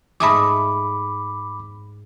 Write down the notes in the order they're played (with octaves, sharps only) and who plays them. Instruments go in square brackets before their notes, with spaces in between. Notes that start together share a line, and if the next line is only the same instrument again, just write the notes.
[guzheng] G#2 A3 G#4 [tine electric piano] B5 D6